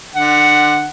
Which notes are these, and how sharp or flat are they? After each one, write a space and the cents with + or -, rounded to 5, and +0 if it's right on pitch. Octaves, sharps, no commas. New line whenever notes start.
D3 +30 F#5 +0